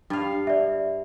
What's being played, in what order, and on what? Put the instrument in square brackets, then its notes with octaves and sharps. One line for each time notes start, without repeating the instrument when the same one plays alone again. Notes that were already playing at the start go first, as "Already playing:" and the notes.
[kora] G2 F5
[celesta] D5 E5